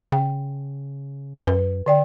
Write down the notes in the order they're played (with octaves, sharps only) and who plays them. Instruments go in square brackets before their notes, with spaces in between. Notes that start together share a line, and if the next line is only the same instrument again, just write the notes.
[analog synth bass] C#3 [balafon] G5
[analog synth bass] F#2 [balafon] B4
[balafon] D3 D5 G5